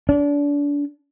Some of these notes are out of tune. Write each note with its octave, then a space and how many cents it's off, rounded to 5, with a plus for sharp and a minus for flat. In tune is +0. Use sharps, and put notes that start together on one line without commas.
D4 -30